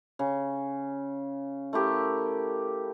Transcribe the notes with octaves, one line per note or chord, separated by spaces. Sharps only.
C#3
A3 E4 G4 A#4